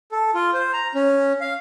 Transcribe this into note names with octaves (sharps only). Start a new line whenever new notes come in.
A4
F4
C5
A#5
C#4
F5